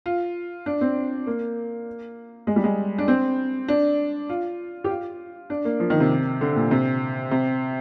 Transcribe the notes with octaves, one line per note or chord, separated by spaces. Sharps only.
F4
D4
C4
A#3
G#3
G3
G#3
D4
C4
D4
F4
G4
F4
D4
A#3
F3
D#3
C3
D3
A#2
C3
C3